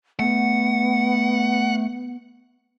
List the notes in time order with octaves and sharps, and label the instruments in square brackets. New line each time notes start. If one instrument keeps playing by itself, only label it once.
[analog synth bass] A3 [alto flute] B3 [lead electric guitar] F#5